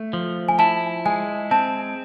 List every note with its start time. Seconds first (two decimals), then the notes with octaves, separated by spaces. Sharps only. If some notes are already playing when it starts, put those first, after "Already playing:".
Already playing: A3
0.13 F3
0.49 G#5
0.59 E4 A5
1.06 G#3 G#5
1.51 C4 A5